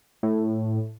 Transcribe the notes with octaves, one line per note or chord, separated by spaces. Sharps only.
A2